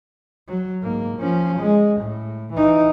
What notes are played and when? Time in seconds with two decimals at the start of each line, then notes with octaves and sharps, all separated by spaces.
0.48 F#3
0.82 G#2 A#3
1.18 F3 C#4
1.60 G#3
2.01 A2
2.54 E3 D#4